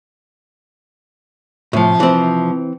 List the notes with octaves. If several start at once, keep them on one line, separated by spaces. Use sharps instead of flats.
A2 C3 F3
E3 C4